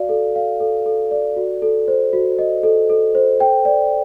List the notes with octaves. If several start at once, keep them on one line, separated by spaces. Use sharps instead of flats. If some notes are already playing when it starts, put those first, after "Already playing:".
Already playing: F#4 D5 F5
A4
F5
A4
A4
D5
F#4
A4
C5
F#4
D#5
A4
A4
C5
G5
D5